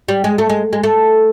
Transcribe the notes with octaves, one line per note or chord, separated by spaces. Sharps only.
G3
G#3
A3
G#3
G#3
A3